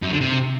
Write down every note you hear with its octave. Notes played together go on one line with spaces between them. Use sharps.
F#2
D3
C3